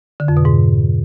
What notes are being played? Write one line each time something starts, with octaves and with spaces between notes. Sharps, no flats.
D3
F2
B2
G#2